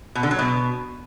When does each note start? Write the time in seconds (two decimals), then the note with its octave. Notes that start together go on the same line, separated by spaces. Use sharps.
0.15 B2
0.23 D3
0.31 F#3
0.39 B2